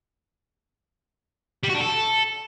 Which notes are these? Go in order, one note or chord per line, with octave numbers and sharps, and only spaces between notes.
G3
F#4
D4
A4